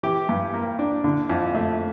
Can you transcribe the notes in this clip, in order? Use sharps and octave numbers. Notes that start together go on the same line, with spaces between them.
E3 G4
G2
A#3
D4
D3
F2
A3